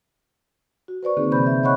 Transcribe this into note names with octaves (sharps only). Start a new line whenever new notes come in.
F#4
B4 C5 D5 C#6
D3 D#3 A#3 C4 D#4 G#4
C3 E3 C5 B5 G6
E5
C#5 D#5 F#5 B5 C#6 F#6